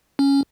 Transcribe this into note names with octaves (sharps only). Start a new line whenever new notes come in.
C#4